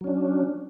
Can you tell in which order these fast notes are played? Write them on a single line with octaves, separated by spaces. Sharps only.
F#3 C#4 D4